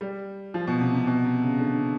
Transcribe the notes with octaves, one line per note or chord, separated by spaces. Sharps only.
G3
F3
B2
C3
C3
B2
C3
C#3
D3